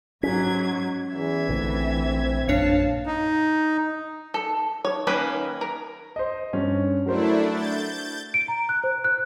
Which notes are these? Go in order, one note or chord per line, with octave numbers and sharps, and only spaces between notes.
G#2 F#3 C#4 G#6 B6
E2 E3 E5 G#6
A#1 D3 A3 C4
A#1 F#2 A#2 D4 C#5 F5 A5 C#7
D#4
A4
C#5
D#3 A#3 C#4 B4 B5
A#4
C5 D#5
G2 C#4
F#3 A3 D4 E4 A#4 C5
G6 A6
D7
A#5
F#6
C5
F#6